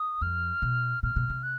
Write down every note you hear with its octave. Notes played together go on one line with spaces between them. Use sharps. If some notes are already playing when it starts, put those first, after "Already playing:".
Already playing: D#6
F2 F6
B2
A#2 F6
B2
C3
F#6